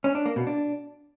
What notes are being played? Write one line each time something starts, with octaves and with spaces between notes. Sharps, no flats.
C#4
D4
A#3
B2
D4